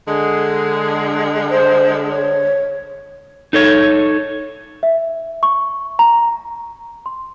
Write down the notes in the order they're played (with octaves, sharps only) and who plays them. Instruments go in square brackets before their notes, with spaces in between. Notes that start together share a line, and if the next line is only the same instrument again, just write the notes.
[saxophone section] D3 G#3
[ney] C5
C#5
[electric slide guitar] D#4 A4 C#5
[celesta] E5
C#6
A#5
C6